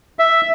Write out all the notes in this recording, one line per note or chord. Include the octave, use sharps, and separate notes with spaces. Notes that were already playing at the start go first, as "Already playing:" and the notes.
E5